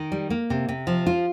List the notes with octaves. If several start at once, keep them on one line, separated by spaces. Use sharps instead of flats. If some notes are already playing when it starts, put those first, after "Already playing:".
Already playing: D#3
G3
A#3
C3
C3
F3
F4